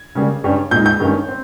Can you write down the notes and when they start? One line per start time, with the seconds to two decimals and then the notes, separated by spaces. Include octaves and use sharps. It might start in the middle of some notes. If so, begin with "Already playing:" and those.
Already playing: G#6
0.15 C#3 G3 A#3
0.44 G2 G3 C#4
0.71 A#2 G#3 D#4 G6
0.86 G6
1.00 G2 D#3 A#3 C#4
1.28 C4